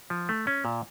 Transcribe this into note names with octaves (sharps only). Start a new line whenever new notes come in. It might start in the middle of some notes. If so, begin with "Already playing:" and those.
F3
A3
C#4
A#2